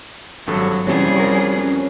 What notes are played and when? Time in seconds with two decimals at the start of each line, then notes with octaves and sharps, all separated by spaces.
0.47 G#1 G2 F#3 A4
0.87 F2 C3 E3 G3 C#4 G#4
1.16 A#4 A#5 C#6
1.57 C#4